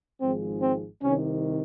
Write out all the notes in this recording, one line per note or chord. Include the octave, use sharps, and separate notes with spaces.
G#1 G#2 F3 G#3 C4
C4
C2 C3 D#3 C#4